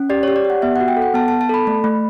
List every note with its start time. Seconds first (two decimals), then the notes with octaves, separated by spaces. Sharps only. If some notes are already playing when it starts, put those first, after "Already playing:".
Already playing: C#4
0.10 G4 D5
0.23 G4 C#5
0.36 D5
0.45 G4
0.50 F#5
0.62 B3 E5
0.76 F#4 F#5
0.88 G5
0.97 A4
1.02 F#5
1.14 B3 A5
1.28 A5
1.32 B3
1.41 A5
1.49 A4 B5
1.67 A3
1.84 A3